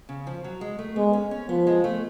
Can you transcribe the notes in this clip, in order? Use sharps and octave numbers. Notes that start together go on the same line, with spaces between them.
C#3
F3
F#3
G#3
A3
G#3 B3
C#4
C#4
F3 B3
G#3
A3